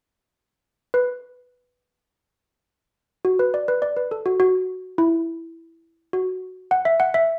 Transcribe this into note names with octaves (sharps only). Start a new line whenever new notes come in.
B4
F#4
B4
D5
B4
D5
B4
A4
F#4
F#4
E4
F#4
F#5
E5
F#5
E5